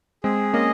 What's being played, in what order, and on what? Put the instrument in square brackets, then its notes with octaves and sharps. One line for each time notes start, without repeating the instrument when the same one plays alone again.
[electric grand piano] G#3 C4 [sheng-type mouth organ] G#4
[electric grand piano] A#3 C#4 [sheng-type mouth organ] D#5